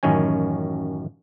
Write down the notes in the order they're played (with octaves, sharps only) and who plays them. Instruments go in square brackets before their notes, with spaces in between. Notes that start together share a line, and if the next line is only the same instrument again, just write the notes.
[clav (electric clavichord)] A1 F#2 D#3 C#4 G#5